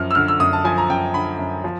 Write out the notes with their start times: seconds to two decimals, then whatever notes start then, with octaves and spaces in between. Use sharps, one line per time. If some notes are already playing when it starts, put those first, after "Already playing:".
Already playing: F#2 F3 F6
0.11 E6
0.15 D3 F6
0.28 E6
0.40 F#2 D#6
0.53 A5
0.64 F3 G#5
0.78 A#5
0.89 F#2 G5
1.14 D3 B5
1.39 F#2
1.64 F3